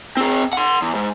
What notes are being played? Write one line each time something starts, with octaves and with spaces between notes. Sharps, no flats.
C4 G#4
F#5 C6
E2
G#2